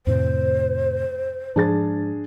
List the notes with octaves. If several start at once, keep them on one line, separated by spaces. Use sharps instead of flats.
F2 A2 C3 C5
G#2 F3 D4 G#4 A6